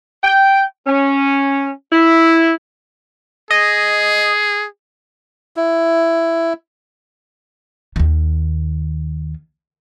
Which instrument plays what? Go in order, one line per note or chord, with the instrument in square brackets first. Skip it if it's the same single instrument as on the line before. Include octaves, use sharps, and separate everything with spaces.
[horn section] G5
C#4
E4
[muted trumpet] G#4 [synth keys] D#5
[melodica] E4
[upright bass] D#2 D#3